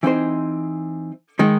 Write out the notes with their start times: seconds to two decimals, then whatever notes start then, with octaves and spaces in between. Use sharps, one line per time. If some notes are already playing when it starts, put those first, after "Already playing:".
0.03 E3 C4 D#4 G#4 C5
1.39 D#3 G#3 D#4